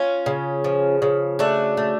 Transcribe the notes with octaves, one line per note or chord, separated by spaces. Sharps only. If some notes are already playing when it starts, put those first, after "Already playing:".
Already playing: C#4 F4
C#3
F3
C#3
A3 D4 F#4
A3